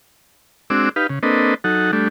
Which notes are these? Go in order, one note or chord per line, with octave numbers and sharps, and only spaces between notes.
G#3 C4 D4 F#4 D6 E6
D#4 G4 B4 F5
C#3
A#3 C4 D4 A4 B4 D#5
F#3 D#4 A4 F#5
G3 A3 D4